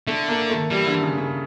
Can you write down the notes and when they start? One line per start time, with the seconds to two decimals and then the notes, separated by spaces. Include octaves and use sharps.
0.07 D3 A3
0.29 A#3
0.50 A3
0.70 E3 G3
0.87 D3
1.03 C#3
1.18 C#3